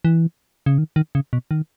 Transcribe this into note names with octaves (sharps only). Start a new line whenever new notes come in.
E3
C#3
D#3
D#3
C#3
B2
D#3